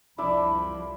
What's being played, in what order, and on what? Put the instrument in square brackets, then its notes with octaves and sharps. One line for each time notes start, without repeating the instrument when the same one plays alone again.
[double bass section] C2 F2 F3 [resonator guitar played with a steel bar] D4 [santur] E4 D5 E5 [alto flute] B5